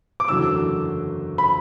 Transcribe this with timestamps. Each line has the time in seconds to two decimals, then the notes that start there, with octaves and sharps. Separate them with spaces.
0.20 D6
0.28 F#1 E2 D3 F#3 A3 E6
1.38 B5